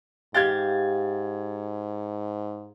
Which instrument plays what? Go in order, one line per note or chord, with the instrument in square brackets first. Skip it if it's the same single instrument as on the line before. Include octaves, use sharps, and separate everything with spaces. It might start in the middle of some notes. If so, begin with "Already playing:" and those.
[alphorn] G#2 [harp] G4 F5 G5 [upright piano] G#6 A6